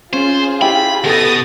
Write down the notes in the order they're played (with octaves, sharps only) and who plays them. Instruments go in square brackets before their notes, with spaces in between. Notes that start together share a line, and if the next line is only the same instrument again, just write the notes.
[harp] C#4 [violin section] F4 G#4 [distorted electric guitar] C5
[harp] E4 G4 [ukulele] G5 [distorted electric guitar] B5
[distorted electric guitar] D2 B2 [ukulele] A4 F#5 [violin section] D#6 A6 A#6